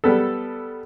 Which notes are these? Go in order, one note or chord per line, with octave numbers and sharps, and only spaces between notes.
G3 B3 A4